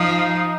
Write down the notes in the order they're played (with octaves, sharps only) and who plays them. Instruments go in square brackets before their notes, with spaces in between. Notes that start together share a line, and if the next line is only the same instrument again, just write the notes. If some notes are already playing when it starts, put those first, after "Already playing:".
Already playing: [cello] F3 [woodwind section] D#4